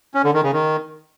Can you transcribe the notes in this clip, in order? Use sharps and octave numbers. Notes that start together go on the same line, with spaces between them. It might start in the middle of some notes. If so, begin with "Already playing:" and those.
C#4
D3
D#3
C#3
D#3